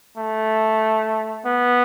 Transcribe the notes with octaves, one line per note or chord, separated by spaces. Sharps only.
A3
B3